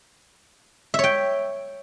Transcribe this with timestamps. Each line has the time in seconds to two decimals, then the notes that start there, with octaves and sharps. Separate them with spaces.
0.94 E5
0.99 C#5
1.04 G5